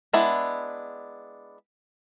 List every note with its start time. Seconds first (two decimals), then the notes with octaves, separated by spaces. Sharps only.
0.13 G#3 B3 D4 E4